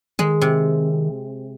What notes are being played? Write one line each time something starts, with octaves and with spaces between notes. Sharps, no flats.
D#3 G#3
C3